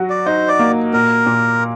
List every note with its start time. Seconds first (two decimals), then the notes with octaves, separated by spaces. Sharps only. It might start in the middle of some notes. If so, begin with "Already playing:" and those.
Already playing: F#3 F#4
0.09 D5
0.26 D#4 C5
0.48 D5
0.59 A#3
0.93 A#2 A#4
1.26 A#2